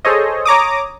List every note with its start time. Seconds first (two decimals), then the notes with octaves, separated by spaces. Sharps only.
0.05 G#4 A4 C5 C#5 D#5
0.45 C#5 A#5 D6 D#6